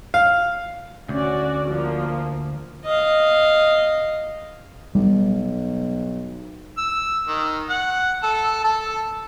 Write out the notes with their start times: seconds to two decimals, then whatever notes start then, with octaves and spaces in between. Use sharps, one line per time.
0.14 F5
1.09 D2 C#4 F#4 D5
1.70 F3 A#3
2.84 D#5 F5
4.95 B1 G3
6.78 E6
7.27 D#3
7.69 F#5
8.23 A4
8.64 A4